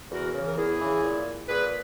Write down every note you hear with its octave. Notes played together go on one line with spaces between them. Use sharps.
E2 F#4 A#4
C#3 E3
A#4
E2 E4 G#4
C#3 E3
A#2
A#2 G#4 B4